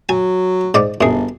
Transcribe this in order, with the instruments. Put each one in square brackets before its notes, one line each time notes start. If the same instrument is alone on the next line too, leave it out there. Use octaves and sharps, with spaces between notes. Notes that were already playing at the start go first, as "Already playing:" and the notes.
[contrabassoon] F#3 [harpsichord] G#5
[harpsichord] G#2 D5 D6
[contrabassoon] G1 [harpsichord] F#2 G#4